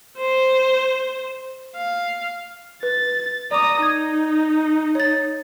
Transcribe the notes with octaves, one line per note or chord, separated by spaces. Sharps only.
C5
F5
B4 A6
D5 A#5 D6 D#6
D#4 G#6
C#5 A6